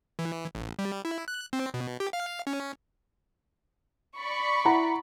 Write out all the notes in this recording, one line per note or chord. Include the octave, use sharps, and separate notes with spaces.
E3
A1
G3
E4
F#6
C4
B2
G4
F5
C#4
D5 B5 C#6
E4 F#5 A#5